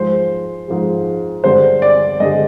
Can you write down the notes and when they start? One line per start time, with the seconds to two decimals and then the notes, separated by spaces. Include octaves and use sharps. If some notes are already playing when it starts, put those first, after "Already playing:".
Already playing: G#2 F3 G#3 C5
0.68 G#2 F3 G#3
1.44 G2 D3 G#3 C5
1.82 D5
2.20 G2 D3 G#3 D#5